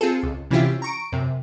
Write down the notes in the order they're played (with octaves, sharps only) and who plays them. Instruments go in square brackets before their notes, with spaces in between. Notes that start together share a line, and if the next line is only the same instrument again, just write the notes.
[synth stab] C4 F4 G#4 A4
C#2
C3 E3 C#4 E4 F4 G4
A#5 C#6 D7
F#2 C3